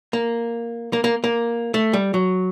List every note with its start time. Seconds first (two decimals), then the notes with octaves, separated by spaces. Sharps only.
0.13 A#3
0.93 A#3
1.04 A#3
1.24 A#3
1.74 A3
1.93 G3
2.14 F#3